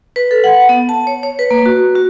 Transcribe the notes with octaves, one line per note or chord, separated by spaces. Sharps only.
B4
A4
F#5
B3
A5
C#5
C#5
B4
A#3
F#4
F#4